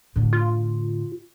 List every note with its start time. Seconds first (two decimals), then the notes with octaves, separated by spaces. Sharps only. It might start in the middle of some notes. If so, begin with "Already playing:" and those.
0.16 A2 D3
0.33 F4